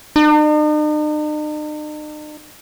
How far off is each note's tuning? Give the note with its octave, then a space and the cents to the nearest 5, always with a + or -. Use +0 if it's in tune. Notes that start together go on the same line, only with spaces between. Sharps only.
D#4 -45